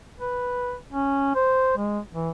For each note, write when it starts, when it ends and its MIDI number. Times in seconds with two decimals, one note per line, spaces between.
0.20 0.76 71
0.92 1.31 61
1.35 1.76 72
1.77 1.99 56
2.13 2.31 52